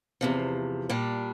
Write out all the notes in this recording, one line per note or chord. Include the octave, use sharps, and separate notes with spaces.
E2 C3 F3
A#2 G3 D4